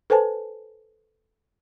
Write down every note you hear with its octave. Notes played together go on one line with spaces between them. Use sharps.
A4 B4 C5 G#5 A5